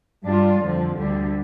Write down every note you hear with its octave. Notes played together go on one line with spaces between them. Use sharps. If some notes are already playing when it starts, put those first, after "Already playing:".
G2 G3 D4 F4
F2 D3 F3
D2 D3 G3